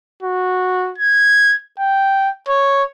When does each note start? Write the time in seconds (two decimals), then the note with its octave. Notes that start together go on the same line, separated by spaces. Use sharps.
0.23 F#4
0.98 G#6
1.79 G5
2.48 C#5